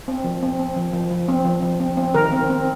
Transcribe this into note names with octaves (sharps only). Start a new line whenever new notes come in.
C4
F3
C4
C4
F3
F3
F3
C4
F3
F3
C4
C4
D#3 A#4
C4
C4